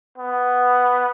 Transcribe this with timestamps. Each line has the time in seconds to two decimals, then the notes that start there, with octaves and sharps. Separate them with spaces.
0.18 B3